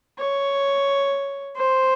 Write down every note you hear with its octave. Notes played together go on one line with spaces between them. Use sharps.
C#5
C5